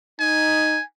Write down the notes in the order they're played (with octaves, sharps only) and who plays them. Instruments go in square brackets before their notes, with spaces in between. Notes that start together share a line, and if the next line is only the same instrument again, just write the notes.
[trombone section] D#4 [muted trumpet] G#5